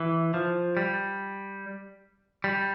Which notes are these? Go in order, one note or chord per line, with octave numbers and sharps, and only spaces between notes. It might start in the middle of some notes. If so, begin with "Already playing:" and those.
Already playing: E3
F3
G3
G3